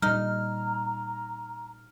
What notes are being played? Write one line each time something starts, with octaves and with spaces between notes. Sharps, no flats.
A#2 G3 D#4 A#5 F6